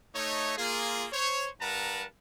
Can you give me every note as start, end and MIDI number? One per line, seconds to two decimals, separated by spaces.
0.15 0.57 57
0.15 0.57 63
0.15 0.57 73
0.58 1.07 58
0.58 1.07 65
0.58 1.07 68
1.12 1.48 72
1.12 1.48 73
1.61 2.05 43
1.61 2.05 70
1.61 2.05 71
1.61 2.05 78
1.61 2.05 81
1.61 2.05 82